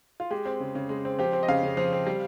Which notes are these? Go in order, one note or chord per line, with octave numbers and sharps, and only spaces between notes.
F4
G#3 G4
C4
C#3
C#3
G#3
C4
F3 G4
C4
D#5
C#3 F5
C#3
F3
C4
G3